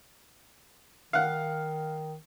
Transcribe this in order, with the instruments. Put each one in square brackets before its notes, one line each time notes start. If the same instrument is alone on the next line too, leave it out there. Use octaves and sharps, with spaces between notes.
[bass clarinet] D#3 [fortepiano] F5 F#5